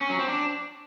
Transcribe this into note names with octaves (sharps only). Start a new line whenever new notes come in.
C#4
F#3
C4
D4